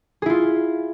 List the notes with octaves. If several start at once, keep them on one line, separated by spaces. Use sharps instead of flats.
E4 F4 G#4